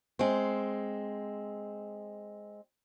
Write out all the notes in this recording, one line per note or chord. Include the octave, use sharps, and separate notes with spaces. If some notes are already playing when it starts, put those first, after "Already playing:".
G#3 C4